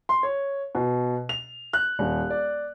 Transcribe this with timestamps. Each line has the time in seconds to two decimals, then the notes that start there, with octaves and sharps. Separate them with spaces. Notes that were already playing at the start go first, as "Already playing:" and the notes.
0.09 C6
0.23 C#5
0.75 B2
1.29 F7
1.73 F#6
1.99 D#1
2.30 D5